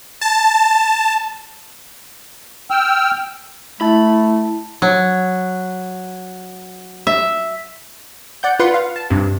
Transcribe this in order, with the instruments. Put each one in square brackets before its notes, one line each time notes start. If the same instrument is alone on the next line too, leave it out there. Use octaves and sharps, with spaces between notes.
[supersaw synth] A5
[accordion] G5 E6 F6
[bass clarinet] A3 [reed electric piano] E4 A5 [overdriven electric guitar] B5
[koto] F#3
E5
[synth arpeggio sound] D5 F#5 G6
F4 B4 F#5 C6
F5
A5
G2 C3